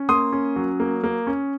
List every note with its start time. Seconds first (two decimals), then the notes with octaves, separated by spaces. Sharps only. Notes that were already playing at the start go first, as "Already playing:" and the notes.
Already playing: C#4
0.09 A#3 C6 D#6
0.32 C#4
0.56 F#3
0.80 A#3
1.04 A#3
1.27 C#4